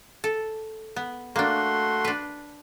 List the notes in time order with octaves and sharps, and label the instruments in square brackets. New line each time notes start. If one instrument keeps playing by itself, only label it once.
[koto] A4
B3
[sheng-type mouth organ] A3 F#4 C6 [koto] A#3 D4
[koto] D4 B4